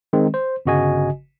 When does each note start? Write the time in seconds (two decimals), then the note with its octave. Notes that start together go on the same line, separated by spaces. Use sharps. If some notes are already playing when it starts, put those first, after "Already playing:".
0.13 D#3 G#3 C4
0.34 C5
0.66 G1 C#3 F#4 D#5 G#5